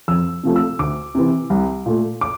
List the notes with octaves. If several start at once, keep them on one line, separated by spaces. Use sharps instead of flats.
F2 E6
C3 F3 A3
E6
D2 D6
C3 E3
C2
A#2 A3
D6